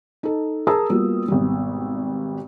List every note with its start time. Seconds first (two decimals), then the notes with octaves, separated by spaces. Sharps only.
0.23 D#4 A4
0.67 G#4 A#4 A5 A#5 D#6 E6
0.90 G3 A#3 B3 F4 F#4
1.28 G#1 B2 G3